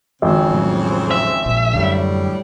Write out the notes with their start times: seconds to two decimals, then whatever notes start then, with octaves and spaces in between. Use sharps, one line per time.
0.22 G#1 F2 C#3 C4
0.51 A2 F#3
1.11 E5
1.46 A#1
1.73 F#2 A2 D3 G3